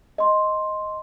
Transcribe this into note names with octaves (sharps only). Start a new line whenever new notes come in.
D#5 C6